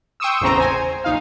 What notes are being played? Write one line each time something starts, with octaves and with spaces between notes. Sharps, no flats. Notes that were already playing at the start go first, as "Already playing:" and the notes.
G5 C6 C#6 D#6 E6
G#1 E2 A2 C#3 C4 A#5
C5 G#5
A#1 D#4 F5